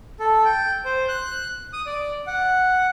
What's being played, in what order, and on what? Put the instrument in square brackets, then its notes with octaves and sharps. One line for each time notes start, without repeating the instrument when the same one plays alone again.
[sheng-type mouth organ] A4
G5
C5
F#6
D#6
D5
F#5